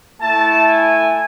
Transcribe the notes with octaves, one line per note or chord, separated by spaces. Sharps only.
A3 E4 A5
G#5